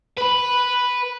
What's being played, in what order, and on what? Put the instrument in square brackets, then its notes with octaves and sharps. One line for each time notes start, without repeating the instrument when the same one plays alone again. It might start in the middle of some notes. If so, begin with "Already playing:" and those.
[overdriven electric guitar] B4 B5